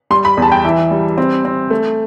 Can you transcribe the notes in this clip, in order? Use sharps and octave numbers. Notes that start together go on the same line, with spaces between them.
G3 C6
B5
E2
A5
G5
E3 E5
G3
C4
C4
A3